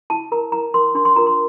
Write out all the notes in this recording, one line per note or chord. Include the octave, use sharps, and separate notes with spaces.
E4 A5
A#4 A#5
E4 A#5
A#4 C6
D4 C6
C6
F4 A#4 A#5
C6